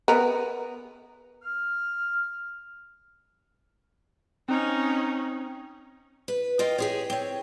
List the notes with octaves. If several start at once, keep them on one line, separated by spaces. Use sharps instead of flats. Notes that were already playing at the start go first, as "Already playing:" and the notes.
B3 A#4
F6
C4 C#4 D#4
B4
F4 A#4 D#5 G5
G4 G#4 C#5
C4 C#5